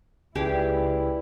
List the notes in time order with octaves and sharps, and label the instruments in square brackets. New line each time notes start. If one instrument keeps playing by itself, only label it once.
[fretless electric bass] C#2 [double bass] E4 [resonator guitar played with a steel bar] G4 G#4 [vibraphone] B4 D5 G5